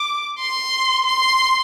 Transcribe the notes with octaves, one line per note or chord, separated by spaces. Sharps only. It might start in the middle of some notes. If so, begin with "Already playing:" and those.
Already playing: D6
C6
C6